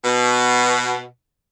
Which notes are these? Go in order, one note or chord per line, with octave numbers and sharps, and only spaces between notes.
B2